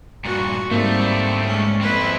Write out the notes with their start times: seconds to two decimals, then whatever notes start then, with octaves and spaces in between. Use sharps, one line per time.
0.25 G2 A#2 F#4
0.71 G#2 G3 A3 A#3 C4
1.01 A3 D4
1.45 G#3 C#4
1.81 F2 C4 E4 B4